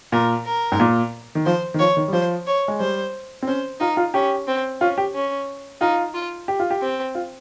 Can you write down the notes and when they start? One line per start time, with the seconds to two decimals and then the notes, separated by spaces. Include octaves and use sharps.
0.12 A#2 A#4
0.45 A#4
0.72 G#2
0.80 A#2
1.35 D#3
1.46 F3 C5
1.74 D#3
1.79 F3 C#5
1.97 D#3
2.08 G3
2.13 F3 C5
2.47 C#5
2.68 G#3
2.80 G3 C5
3.42 C4
3.47 C#4 C5
3.80 D#4 F4
3.97 F4
4.14 C#4 G4
4.48 C4
4.81 C#4 F4
4.98 G4
5.14 C#4
5.81 D#4 F4
6.14 F4
6.48 G4
6.60 F4
6.70 G4
6.82 C4
7.15 F4